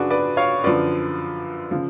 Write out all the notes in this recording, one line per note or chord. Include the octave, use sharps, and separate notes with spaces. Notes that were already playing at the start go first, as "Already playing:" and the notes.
Already playing: F#2 C#3 F3 D4 F#4 G#4 B4
B4 D5
C#5 F5
F#2 D3 F3 B4 D5
C#3 F3